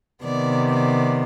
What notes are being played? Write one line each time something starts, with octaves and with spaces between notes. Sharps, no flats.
C3 D#3 B3 D5
D5